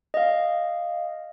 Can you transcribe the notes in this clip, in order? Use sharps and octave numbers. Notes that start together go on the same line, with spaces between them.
D#5 F5